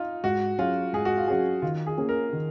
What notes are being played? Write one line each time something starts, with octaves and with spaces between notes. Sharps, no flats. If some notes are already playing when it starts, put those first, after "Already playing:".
Already playing: D#4 F4
G#2 F#4
F#3 C#4 F4 G#4
G#2 G#4
F#4
F4
F#3 C#4 F#4 G#4
D#3 F4
G#4
A#3 C#4 G#4
A#4
D#3